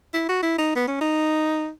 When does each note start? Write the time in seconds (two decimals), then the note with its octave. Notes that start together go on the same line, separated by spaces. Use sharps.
0.14 E4
0.29 F#4
0.43 E4
0.58 D#4
0.75 B3
0.88 C#4
1.01 D#4